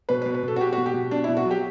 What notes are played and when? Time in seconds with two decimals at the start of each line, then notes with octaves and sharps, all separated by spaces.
0.09 B2 B4
0.22 B4
0.26 B2
0.34 B4
0.43 B2 A4
0.56 F#4
0.60 B2 G4
0.72 F#4
0.78 B2
0.86 G4
0.94 B2
1.11 B2 D4
1.24 E4
1.28 B2
1.37 F#4
1.45 F#3
1.51 G4